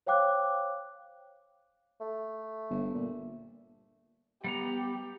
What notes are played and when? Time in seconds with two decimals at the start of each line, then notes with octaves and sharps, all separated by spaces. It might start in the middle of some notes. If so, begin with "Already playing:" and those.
0.07 C5 C#5 F5 G5 D6 F#6
2.01 A3
2.70 G1
2.94 A#2
4.44 G3 B3 G4 A#5